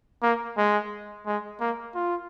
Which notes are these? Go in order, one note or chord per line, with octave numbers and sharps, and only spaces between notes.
A#3
G#3
G#3
A#3
F4